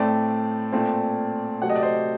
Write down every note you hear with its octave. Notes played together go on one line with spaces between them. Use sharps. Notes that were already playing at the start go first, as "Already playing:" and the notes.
Already playing: A2 A3 C4 D5
A#2 A3 C4
C3 F#3 A3 C4 F#5
D#5
D5
C5 D#5